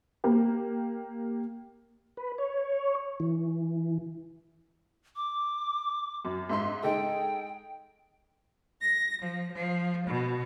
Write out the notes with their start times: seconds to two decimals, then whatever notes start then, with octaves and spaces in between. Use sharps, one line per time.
0.24 A#3 G4
2.17 B4
2.38 C#5
3.20 E3
5.16 D6
6.25 F#2
6.49 G#2 E5 C6
6.83 G#3 D#4 A4 G5
8.81 A#6
9.21 F3
9.51 F3
10.05 B2